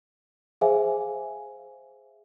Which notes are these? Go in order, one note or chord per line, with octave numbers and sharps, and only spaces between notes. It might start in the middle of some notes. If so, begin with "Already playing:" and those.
G#4 C5 E5 F5 G#5